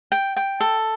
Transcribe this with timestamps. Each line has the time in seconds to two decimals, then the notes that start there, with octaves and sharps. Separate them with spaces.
0.12 G5
0.37 G5
0.60 A4